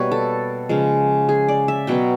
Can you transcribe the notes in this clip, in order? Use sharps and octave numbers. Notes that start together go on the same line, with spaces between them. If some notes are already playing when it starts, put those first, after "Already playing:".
Already playing: B2 G3 A#3 B4 C#5
A4
C#3 F3 G#3
G#4
D5
E5
B2 F#3 B3 G5